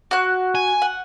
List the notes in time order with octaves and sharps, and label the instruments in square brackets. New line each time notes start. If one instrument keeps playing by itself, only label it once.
[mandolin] F#4 F#6
[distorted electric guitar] G#5
[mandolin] F#5